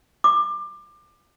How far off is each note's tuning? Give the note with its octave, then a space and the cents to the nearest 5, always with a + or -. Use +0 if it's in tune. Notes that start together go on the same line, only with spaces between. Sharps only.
D6 +25